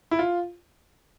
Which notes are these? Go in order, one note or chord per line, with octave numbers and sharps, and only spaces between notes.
E4
F4